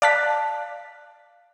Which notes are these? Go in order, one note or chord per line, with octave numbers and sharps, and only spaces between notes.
D5 F5 A5 F#6 B6